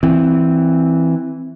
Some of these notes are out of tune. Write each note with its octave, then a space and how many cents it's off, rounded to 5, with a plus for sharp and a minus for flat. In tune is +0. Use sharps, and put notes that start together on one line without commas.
E3 +0 C4 +0